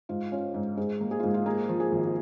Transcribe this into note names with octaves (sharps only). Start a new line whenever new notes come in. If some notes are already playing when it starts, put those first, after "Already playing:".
G#2 F4
C#4 F4
G#2
G#2 G#4
A#3
G#4
F4
G#2
F4
A#3 G#4
F3
G#4
G#1